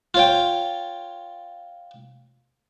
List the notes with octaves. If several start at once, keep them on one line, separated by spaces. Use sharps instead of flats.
F4 C#5 G5